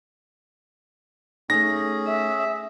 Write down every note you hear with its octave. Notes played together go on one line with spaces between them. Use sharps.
A3 C#4 D#4 G#4 A#6
E5